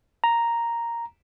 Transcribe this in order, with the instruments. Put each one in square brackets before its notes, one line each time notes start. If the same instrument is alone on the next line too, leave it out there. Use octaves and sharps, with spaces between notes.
[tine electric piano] A#5